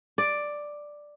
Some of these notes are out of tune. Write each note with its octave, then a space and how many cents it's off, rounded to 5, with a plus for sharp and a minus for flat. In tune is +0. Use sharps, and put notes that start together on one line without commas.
D5 +5